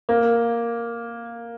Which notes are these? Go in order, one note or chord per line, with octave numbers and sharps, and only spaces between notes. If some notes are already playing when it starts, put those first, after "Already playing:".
A#3